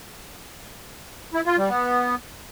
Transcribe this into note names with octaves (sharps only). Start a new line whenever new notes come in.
E4
F4
G3
B3